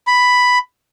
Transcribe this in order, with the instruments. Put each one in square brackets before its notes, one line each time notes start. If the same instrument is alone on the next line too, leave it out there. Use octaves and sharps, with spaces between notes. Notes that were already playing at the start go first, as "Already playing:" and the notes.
[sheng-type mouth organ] B5